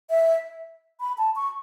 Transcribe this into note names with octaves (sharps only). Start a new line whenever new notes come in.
E5
B5
A5
C#6